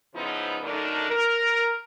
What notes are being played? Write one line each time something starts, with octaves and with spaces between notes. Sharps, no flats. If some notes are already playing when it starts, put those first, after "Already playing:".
C#3 F3 B3 D#4 E4 C5
F#2 D3 A3 D4 D#4 A#4
A#4